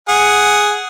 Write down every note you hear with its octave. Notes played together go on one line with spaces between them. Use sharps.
G#4 F#5